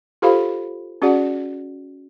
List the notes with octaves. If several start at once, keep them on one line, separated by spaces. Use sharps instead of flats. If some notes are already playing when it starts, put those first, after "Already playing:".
F4 G4 A4 C5 F5 B5
C#4 F#4 G#4 D5 F#5